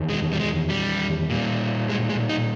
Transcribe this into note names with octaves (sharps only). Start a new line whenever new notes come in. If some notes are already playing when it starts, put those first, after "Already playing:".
Already playing: E2 D#3
G#3
G3
G#3
G3
A#2 G3
G#3
G#3
D#4